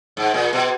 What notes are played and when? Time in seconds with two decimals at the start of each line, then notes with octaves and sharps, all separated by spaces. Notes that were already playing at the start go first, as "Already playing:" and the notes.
0.17 G#2
0.34 A#2
0.53 B2